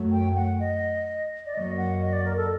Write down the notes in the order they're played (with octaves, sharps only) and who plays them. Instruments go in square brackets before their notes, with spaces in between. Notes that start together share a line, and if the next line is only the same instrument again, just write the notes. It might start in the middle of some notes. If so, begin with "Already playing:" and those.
Already playing: [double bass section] F#2 F#3 A3
[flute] G5
F#5
D#5
D5
[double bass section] F#2 F#3 A#3 [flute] D#5
[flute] F#5
D#5
D5
A#4
A4